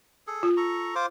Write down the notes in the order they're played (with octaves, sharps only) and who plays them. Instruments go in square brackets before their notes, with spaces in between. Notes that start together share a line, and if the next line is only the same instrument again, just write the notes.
[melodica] G#4 A4
[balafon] F4
[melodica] A4 A#5 C#6
F4 C5 D6